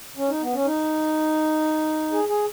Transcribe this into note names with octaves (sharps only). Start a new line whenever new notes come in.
C#4
D#4
B3
C#4
D#4
G#4
G#4